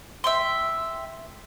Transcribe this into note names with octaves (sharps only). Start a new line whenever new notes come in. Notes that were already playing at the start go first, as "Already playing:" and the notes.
E5 G5 C6